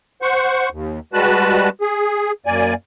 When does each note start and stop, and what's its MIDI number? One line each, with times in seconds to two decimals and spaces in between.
0.22 0.69 72
0.22 0.69 78
0.22 0.69 85
0.71 0.99 39
1.13 1.69 55
1.13 1.69 56
1.13 1.69 66
1.13 1.69 71
1.13 1.69 81
1.13 1.69 90
1.81 2.32 68
2.46 2.74 42
2.46 2.74 58
2.46 2.74 74
2.46 2.74 80